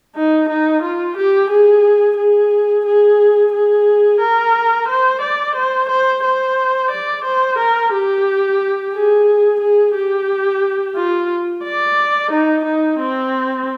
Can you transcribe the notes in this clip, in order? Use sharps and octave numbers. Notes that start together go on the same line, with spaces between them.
D#4
D#4
F4
G4
G#4
G#4
G#4
G#4
A#4
C5
D5
C5
C5
C5
D5
C5
A#4
G4
G#4
G#4
G4
F4
D5
D#4
D#4
C4